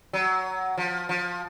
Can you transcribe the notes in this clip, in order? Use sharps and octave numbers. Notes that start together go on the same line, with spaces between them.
F#3
F3
F3